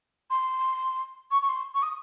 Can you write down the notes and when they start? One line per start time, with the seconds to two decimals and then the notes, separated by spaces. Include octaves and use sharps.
0.30 C6
1.31 C#6
1.42 C#6
1.49 C6
1.74 C#6
1.82 D#6